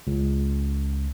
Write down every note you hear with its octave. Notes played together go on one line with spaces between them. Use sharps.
C#2